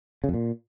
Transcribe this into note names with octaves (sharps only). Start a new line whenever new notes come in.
C#3
F2
A#2